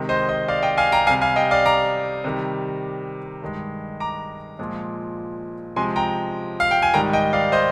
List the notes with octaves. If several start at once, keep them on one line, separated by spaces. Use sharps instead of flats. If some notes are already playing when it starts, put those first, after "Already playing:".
Already playing: C3 D#3 G#3
C5 D#5
C5 D#5
D5 F5
D#5 G5
F5 G#5
G5 A#5
C3 G3 F5 G#5
F5 G#5
D#5 G5
D5 F5
A#5 D6
C3 D#3 G3
G2 D#3 G#3
A#5 D6
A#2 F3 G#3
C3 F3 G#3 G#5 C6
G5 A#5
F5
G5
G#5
G#2 D#3 G3 G5 A#5
D#5 G5
D5 F5
C5 D#5